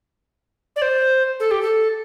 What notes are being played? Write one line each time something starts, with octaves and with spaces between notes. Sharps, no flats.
D5
C5
A4
G4
A4